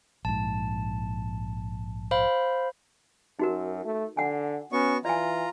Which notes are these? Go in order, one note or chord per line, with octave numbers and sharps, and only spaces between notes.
A#1 G#2 A5
C5 F5 B5
F#2 D#4 F#4 A#4
A3
D3 F#5 G#5
B3 C#4 F#4 C#6
E3 F4 D5 G#5 A#5